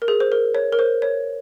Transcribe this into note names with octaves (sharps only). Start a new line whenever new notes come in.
A#4
G#4
C5
A#4
C#5
A#4
C5
C#5